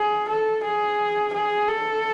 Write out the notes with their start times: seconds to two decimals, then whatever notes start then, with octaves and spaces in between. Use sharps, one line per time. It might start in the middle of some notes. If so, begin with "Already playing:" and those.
Already playing: G#4
0.28 A4
0.63 G#4
1.33 G#4
1.68 A4